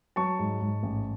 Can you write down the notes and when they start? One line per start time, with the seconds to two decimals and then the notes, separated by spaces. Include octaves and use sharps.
0.16 F#3 A5 C#6
0.39 G#2
0.61 G#2
0.83 A1